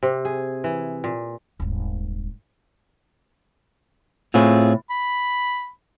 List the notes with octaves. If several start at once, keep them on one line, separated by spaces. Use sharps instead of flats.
C3
G#4
E3
A#2
D#1 G#1
A2 C4 F4 G#4
B5